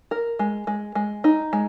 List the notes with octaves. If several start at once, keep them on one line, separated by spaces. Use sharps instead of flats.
A#4
G#3
G#3
G#3
D#4
G#3